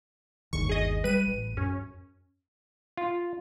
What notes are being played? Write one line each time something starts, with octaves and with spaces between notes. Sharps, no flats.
G1 D#2 D#3 C#6
G#4 D#5
G3 B4 D#7
A1
F#2 C#4
F4